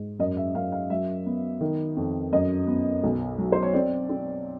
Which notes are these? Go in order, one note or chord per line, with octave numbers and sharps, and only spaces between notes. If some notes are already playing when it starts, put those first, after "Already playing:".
Already playing: G#2
F#2 D#5
E5
F#2 F5
F5
F#3 E5
B3
D#3
F2
F#2 D#5
B3
B1
F#3
C5
C#5
C4 D5
C4